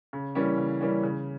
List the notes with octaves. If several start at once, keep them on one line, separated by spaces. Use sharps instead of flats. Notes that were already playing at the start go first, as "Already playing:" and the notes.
C#3
E3 G3 A#3 C#4
C#3
E3 G3 A#3 C#4
C#3